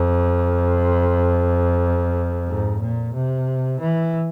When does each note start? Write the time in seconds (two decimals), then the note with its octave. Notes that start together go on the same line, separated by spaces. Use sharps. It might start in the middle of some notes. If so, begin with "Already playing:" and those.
Already playing: F2
2.46 G#2
2.81 A#2
3.14 C3
3.81 E3